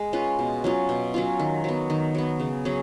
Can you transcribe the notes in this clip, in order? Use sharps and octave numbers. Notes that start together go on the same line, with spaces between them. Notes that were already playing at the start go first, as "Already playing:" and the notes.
Already playing: G#3
C#4 F4 B4
B2
F#3 C#4 F4
B2
F#3 C#4 F4
D#3
F#3 B3
D#3
F#3 B3
C#3
F#3 C#4 G#4